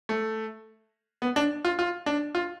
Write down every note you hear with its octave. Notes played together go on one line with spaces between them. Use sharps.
A3
B3
D4
F4
F4
D4
F4